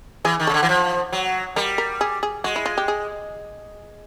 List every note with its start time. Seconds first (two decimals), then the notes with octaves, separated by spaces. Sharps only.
0.25 E3 G#4
0.40 D#3
0.47 C#3 A4
0.54 D3
0.63 E3
0.69 F3
1.12 F#3
1.56 G3 A#4
1.78 A#4
2.01 G#4
2.23 G#4
2.44 G#3 F#4
2.56 E4
2.66 F4
2.78 G4
2.88 G#4